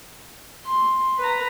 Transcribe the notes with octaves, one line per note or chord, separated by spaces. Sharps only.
C6
B4 A#5